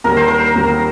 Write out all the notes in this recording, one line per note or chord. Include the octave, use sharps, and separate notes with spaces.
D#2 D3 G3 A#3 A#4
C5
A#4
D#2 D3 G3 A#3